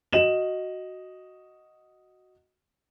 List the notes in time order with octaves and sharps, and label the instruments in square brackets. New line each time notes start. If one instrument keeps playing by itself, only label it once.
[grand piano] F#4 D#5 E7 F#7